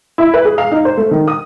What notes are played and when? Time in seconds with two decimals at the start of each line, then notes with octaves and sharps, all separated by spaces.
0.18 E4
0.34 B4
0.45 G#4
0.58 F5
0.72 D#4
0.85 C5
0.97 A3
1.11 D#3
1.28 D#6